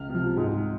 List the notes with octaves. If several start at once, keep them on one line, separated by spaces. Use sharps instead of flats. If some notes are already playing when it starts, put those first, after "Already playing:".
Already playing: C#2 F6
C3 F3
G#2